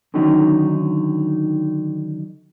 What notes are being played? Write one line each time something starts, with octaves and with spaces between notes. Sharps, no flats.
D3 D#3 F#3 C#4 D#4